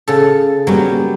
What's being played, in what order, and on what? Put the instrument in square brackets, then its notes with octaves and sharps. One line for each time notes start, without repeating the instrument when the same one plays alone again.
[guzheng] C#3 A4
[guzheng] F#3 C#4 [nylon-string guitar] G3 A#3 B3